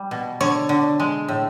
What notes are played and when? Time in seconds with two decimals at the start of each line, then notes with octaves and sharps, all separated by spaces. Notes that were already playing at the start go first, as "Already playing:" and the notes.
Already playing: G3
0.11 B2
0.41 D3 C#5
0.69 D3
1.00 G#3
1.28 A2